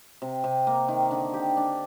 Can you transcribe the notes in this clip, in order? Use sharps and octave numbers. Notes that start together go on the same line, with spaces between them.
C3
C3
A#3
D#3
D3
G4
D4